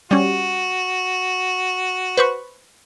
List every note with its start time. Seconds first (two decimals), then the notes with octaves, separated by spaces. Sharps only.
0.11 G3 C#4 F#4
2.17 B4 C5 C#6